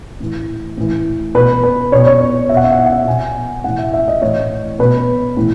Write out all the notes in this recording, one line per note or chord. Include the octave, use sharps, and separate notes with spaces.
A2 E3
A2 E3
B2 B4
B4
B2 C#5
C#5
C#5
B2 E5
F#5
E5
F#5
E5
F#5
E5
B2 G#5
A2 E3 F#5
E5
E5
D#5
A2 E3 C#5
B2 B4
A2 E3